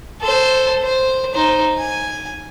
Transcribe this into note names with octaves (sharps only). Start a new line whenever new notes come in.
A4 C5
C5
D#4 C5
G#5